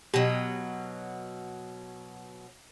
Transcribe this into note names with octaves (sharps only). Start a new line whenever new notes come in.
B2 F#3 G4 D#7